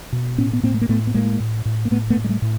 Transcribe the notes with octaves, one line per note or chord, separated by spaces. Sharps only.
B2
A2 B3 C#4
B3
A2 A#3 C4
A3
A#3
A2 A3 B3
B3
A2 G#3 A#3
A2
A2
A#3
A2 A3 B3
A3 B3
A2
G#3
G3 A3
A2